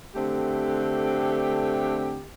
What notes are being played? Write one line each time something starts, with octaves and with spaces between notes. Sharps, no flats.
D3 A3 C4 G4